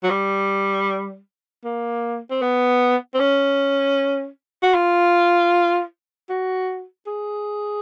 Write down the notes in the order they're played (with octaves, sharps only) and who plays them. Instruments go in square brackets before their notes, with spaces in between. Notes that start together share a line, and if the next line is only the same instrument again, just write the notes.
[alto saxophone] F#3
G3
A#3
C4
B3
C4
C#4
F#4
F4
F#4
G#4